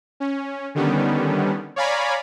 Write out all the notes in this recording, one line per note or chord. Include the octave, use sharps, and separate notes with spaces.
C#4
D3 D#3 G3 B3 C#4
C#5 D5 F5 G#5 A#5 B5